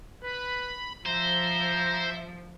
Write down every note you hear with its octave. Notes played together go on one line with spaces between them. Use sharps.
B4 B5
F3 C5 E5 A#5